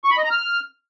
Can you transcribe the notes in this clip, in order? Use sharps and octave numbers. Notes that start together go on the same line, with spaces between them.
C#6
B5
D#5
A#5
F6